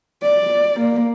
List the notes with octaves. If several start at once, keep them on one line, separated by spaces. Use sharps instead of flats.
D5
A#3